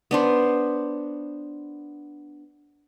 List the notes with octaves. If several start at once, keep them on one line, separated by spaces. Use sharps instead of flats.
B3 D4 C5